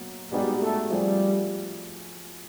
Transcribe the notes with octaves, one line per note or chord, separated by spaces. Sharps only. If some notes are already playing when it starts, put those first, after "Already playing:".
Already playing: B2 F#3 A#3
B2 G3 G#3 B3 D#4
A3
F3 G3 A3 C4 F4 G#4